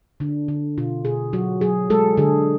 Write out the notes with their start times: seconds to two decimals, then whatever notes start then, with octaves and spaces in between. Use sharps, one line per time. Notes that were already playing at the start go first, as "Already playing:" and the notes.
0.20 D3 D4
0.48 D3
0.78 B2 F4
1.05 B2 G#4
1.33 F#3 F#4
1.61 F#3 G#4
1.90 G#3 A4
2.17 D3 G#4